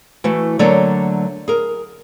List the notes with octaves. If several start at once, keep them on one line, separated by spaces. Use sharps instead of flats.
E3 A3 F#4
D3 F#3 A3 A#3 C#5 D5
G#4 A#4